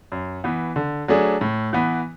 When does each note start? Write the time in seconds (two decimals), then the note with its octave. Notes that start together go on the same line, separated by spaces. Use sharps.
0.12 F#2
0.44 E3 B3
0.76 D3
1.08 F#3 A3 D4 G#4
1.41 A2
1.73 E3 B3